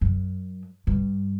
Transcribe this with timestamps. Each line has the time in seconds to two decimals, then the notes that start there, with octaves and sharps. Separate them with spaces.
0.01 F#2
0.87 G2